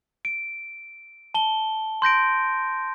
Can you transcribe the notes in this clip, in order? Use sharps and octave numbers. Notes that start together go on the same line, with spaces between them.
D7
A5 G7
C6 G6 A#6 D7